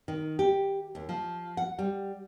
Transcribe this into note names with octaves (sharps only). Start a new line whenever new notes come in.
D#3
G4
D#2
F3
F#5
G3